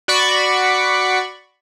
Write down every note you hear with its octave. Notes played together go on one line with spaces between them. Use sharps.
F#4 D5 B5 C#6